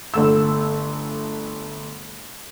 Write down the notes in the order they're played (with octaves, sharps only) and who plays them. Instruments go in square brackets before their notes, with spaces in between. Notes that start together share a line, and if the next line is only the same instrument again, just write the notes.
[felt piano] G1 A3 E6